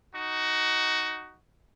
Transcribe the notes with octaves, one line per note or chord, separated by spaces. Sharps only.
D#4 F#4